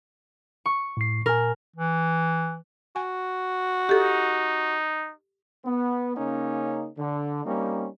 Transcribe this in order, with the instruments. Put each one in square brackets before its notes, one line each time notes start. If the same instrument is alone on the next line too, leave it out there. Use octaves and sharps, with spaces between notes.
[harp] C#6
[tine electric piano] A2 C7
[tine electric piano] A#2 G#5 [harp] A#4
[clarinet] E3
[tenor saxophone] F#4 [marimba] G#5
[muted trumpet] D#4 [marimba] G4 A4
[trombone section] B3
C#3 A#3 C#4 D#4
D3
G3 A#3 C4 C#4 D#4